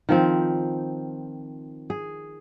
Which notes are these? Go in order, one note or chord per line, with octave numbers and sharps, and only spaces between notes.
D#3 F3 C4
G#4